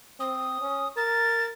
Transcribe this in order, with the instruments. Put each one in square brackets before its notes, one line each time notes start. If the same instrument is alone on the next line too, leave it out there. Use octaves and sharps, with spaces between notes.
[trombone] C4 [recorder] D#6
[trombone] C#4
[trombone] A#4 [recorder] A6